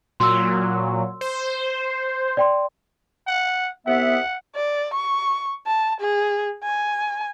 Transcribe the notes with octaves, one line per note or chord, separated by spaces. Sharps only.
A#2 F#3 C6 E6
C5
D5 G5 C6
F#5
C2 B3 E5 F#5
D5
C#6
A5
G#4
G#5